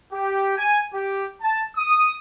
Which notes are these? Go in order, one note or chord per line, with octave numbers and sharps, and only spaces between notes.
G4
G#5
G4
A5
D#6